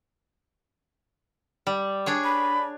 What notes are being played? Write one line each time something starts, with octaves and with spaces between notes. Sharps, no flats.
G3
D4 G#4 C#5
B5